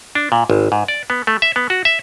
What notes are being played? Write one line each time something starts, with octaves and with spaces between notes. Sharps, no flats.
D4
A#2
G#1
G#2
D5
B3
A3
E5
B3
F#4
E5